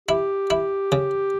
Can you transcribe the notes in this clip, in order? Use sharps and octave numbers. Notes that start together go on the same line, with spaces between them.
E4 G4
E4
C#3